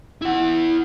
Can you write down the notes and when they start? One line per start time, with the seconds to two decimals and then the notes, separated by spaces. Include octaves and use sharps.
0.22 E4 F#5